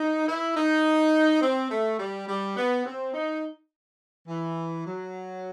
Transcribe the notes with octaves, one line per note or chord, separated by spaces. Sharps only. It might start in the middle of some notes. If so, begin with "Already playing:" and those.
Already playing: D#4
E4
D#4
C4
A3
G3
G3
B3
C4
D#4
E3
F#3